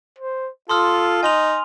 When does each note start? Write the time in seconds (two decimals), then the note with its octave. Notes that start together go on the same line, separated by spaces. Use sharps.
0.19 C5
0.69 F4 A4 C6 D#6 F6
1.23 D#4 G#5 C6 F7